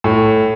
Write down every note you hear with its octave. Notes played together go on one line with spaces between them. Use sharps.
A2